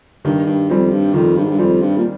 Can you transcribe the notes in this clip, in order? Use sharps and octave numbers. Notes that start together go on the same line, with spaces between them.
G2 D#3
G2
F2 G3 C4
G2
F2 D#3
G2
G#2
G2
F2 G3 C4
G2
A#2